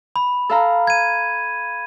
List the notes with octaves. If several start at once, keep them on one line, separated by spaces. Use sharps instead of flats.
B5
A4 F5 A#5
G#6 D#7